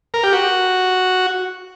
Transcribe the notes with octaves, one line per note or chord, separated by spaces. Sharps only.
A#4
G4
F#4